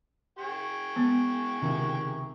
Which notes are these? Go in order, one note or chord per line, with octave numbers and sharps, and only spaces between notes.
G#4 G5 C#6
G#3 B3
C#2 C3 D#3